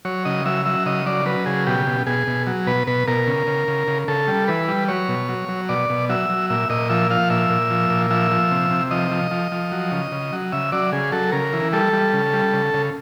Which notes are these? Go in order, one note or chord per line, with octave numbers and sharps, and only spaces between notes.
F#3 C#5
C#3 D#5
F#3 E5
F#3 E5
C#3 D#5
F#3 D5
F#3 B4
C#3 G#4
B2 G4
B2
B2 G#4
B2
F#3
B2 B4
B2 B4
B2 A#4
C#3
C#3
C#3
C#3
C#3 A4
G3
E3 B4
G3
F#3 C#5
B2
F#3
F#3
B2 D5
B2
F#3 E5
F#3
A#2 E5
A#2 D#5
F3 E5
F3 F5
A#2 E5
A#2
F3
A#2
F3 E5
F3
C3
C3
F3 D#5
F3
F3
F3
F#3
C#3
C#3
F#3
C#3 E5
F#3 D5
C#3 G#4
F#3 A4
C#3 A#4
E3
G3 A4
G3
C#3
G3
C#3
C#3